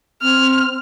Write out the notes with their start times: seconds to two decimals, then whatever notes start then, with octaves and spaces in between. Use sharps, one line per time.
0.22 C4 F6